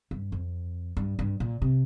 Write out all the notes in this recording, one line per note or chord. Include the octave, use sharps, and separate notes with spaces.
G2
F2
G2
G2
A#2
C3